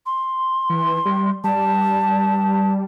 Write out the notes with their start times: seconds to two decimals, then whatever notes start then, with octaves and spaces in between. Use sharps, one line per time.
0.06 C6
0.70 E3
1.05 G3
1.44 G3 A5